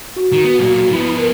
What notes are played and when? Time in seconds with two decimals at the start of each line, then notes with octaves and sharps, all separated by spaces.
0.16 F#4
0.33 D#3
0.45 B3
0.59 B1 A#2
0.92 F3 B3 E4 B5
1.16 A#4